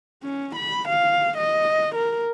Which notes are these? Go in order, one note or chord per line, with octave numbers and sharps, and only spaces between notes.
C#4
B5
F5
D#5
A#4